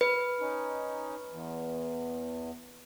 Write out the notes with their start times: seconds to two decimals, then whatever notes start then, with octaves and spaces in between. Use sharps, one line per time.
0.01 B4
0.40 C#4 D#4
1.30 E2